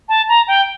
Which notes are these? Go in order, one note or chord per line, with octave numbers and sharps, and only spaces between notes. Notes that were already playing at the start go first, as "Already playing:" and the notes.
A5
A#5
G5